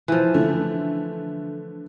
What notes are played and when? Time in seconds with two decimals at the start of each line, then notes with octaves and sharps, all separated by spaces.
0.08 E3 F3
0.34 D3 A3